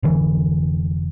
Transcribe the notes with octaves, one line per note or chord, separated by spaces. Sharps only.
F1 D3 E3